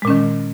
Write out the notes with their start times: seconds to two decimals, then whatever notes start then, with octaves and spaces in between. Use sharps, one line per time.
0.02 G#3
0.05 A#2
0.07 C#4
0.10 D#3